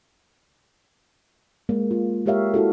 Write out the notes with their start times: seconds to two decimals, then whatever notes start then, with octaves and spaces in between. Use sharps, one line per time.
1.69 G#3 A#3
1.91 F4
2.26 G#3 G4 A#4 C#5 E5 F5
2.54 E4 F#4 A4